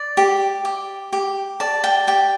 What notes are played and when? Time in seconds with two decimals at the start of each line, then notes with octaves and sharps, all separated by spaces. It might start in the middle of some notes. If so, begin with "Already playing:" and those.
Already playing: D5
0.17 G4
0.65 G4
1.13 G4
1.60 D5 A5
1.84 G5
2.07 G4 G5